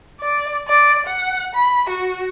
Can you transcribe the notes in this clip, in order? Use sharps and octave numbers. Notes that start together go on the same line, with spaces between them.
D5
D5
F#5
B5
F#4